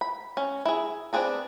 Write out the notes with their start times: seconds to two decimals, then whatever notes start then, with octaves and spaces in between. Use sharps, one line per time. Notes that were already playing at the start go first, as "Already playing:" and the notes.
0.01 B5
0.37 C#4
0.65 E4 G#4
1.13 B3 C4 D4 G#4 A4